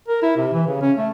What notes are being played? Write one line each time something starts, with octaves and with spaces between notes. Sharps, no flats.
A#4
E4
C3
E3
C#3
C#4
A3